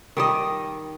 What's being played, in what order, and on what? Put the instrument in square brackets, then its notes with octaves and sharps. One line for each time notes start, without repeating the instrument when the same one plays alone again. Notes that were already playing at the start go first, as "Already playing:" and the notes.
[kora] D#3 G3 D#5